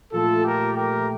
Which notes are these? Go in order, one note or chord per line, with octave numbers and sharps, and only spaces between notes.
A#2 F3 A3 F4 A4
G4 A#4
G4 A#4